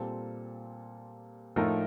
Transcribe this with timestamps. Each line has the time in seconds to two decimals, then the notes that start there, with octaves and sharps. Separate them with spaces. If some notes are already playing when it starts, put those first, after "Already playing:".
Already playing: A#2 G3 C4 F4 A4
1.56 A2 F3 A3 D#4 A#4